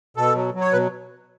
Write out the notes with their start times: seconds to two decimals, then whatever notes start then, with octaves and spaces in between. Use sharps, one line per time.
0.17 B2 A4
0.35 F#3
0.54 F#3
0.61 C#5
0.73 B2 B4